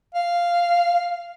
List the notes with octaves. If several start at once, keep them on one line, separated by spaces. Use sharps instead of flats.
F5